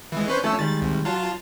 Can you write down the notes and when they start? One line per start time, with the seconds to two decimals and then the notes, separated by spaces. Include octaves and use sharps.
0.12 E3 G#3
0.28 C#4 B4 C5
0.44 F3 A3 C#4 A4 E6
0.59 D#3 G3 G#3 A6
0.82 C2
1.05 F#3 F4 A5